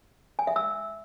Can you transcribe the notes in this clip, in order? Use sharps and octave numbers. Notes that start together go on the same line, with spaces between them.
G#5
E5
E6